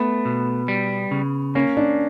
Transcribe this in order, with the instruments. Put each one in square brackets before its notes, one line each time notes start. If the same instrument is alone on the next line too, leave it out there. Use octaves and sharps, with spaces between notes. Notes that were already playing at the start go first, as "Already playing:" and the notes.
Already playing: [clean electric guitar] A3 [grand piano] B3
[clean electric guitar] B2
G3
C#3
[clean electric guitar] A#3 [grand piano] C#4
[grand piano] D4